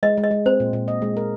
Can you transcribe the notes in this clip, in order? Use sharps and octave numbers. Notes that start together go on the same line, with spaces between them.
G#3 D#5
G#3
D#5
G#3
C4 C5
A#2
A#2
D#5
G#3
A#4